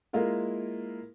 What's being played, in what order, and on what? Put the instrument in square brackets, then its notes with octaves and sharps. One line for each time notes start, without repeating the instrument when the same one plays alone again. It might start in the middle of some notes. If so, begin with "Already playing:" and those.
[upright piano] G#3 A#3 E4 F4 A#4